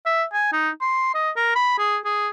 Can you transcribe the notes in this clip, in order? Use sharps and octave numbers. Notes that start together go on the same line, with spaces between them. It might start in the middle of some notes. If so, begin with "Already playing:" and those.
E5
G#5
D#4
C6
D#5
A#4
B5
G#4
G#4